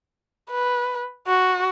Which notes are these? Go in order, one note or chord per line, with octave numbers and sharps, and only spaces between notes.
B4
F#4